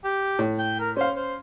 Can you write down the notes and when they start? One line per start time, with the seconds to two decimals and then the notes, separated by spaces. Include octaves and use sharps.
0.04 G4
0.39 A2
0.59 G5
0.79 A#4
0.97 C#4 C5 F5
1.16 C5